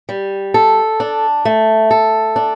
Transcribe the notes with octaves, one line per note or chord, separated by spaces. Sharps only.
G3
A4
D4
A3
A4
D4